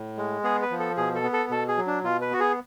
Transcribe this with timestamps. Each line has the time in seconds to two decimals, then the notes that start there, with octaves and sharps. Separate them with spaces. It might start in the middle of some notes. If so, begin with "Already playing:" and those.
Already playing: A2
0.17 G#3
0.43 B3 G#4
0.62 B4
0.71 F3
0.80 A4
0.97 B2 G#4
1.15 A4
1.24 B3
1.33 A4
1.50 B2 A4
1.68 G#4
1.77 F#3
1.87 D4
2.03 B2 F4
2.21 B4
2.31 B3 F#4
2.40 G#4